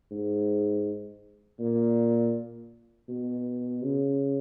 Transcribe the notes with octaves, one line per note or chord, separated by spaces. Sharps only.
G#2
A#2
B2
C#3